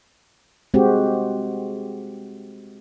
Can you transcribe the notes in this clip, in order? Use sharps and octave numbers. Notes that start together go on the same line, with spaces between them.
G#3 C4 F#4 G4